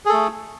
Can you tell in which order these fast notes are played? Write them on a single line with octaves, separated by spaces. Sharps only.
G#4 A4 A3